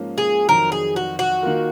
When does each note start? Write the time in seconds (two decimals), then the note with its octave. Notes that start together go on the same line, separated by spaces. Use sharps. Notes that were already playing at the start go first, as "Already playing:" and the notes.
Already playing: G#2 F3 A#3 C#4
0.18 G#4
0.48 F2 D#3 F#3 A#4
0.72 G#4
0.96 F#4
1.19 F#4
1.42 D#3 A#3 F4 A#4